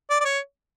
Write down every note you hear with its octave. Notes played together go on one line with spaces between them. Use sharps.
D5
D5
C#5